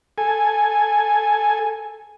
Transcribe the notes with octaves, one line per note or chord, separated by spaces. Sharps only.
A4 G#5